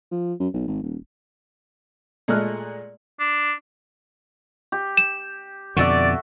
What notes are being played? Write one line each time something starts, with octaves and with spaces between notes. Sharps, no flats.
F3
F#2
B1
G#1
D#1
A#2 G#3 A3 D#5 F6 F#6
D4
G4
E7
F2 B2 D3 F#4 A4 D5 E5